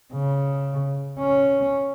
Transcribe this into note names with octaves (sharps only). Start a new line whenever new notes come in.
C#3
C#4